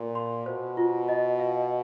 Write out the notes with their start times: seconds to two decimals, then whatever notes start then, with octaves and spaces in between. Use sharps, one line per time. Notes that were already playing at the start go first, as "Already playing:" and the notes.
Already playing: A#2 C6
0.15 C6
0.46 B2 C5
0.77 F4
1.09 D#5
1.40 F5